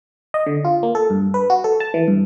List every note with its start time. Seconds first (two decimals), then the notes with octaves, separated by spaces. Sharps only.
0.34 D#5
0.46 D3
0.65 F4
0.83 A#3
0.95 A4
1.10 G2
1.34 B4
1.50 F#4
1.64 A4
1.80 A5
1.94 E3
2.08 G2